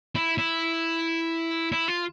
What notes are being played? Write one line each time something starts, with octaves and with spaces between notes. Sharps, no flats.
E4
E4
E4
F4